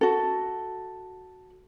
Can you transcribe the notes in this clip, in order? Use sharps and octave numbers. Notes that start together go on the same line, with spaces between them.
F#4 A4